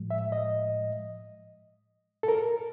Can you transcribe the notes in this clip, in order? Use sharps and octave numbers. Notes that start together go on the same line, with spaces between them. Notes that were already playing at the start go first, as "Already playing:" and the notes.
Already playing: A2 F3 G#3
E5
D#5
A4
A#4